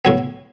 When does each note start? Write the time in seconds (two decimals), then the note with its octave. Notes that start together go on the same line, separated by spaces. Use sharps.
0.05 A2 F#3 B3 C#5